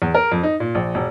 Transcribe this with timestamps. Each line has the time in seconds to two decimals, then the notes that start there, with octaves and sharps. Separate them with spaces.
0.02 E2
0.15 A#4
0.32 F2
0.43 D#4
0.60 A#2
0.75 A#1
0.95 E1